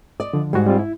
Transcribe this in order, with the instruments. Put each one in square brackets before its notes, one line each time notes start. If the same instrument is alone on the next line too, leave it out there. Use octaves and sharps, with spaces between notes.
[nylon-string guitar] D5 D#5
[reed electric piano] D3 F3
[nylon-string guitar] G#2 [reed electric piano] G3 F#4
[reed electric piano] G3 C4 F4
E4